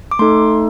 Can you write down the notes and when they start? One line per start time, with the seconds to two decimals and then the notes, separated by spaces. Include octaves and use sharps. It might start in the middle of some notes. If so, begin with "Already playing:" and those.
0.11 D6
0.19 A3 D#4 A4 C6